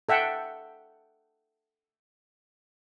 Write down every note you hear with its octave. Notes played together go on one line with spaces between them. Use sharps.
A4 E5 F#5 G5